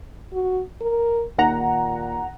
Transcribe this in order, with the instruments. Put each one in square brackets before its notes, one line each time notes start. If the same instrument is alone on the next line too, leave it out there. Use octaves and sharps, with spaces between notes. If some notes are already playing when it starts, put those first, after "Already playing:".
[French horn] F#4
A#4
[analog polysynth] D#2 F#5 A#5 [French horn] A#2